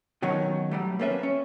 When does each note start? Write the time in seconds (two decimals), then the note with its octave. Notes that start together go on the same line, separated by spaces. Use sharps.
0.22 B2 D#3 F#3 C#4 D#4 C#5
0.71 F#3 G3 A3
0.99 A#3 C4 C#4 A4 B4 E5
1.23 C#4